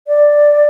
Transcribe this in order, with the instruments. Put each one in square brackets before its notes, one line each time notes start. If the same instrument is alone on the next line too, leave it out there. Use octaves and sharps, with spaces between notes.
[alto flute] D5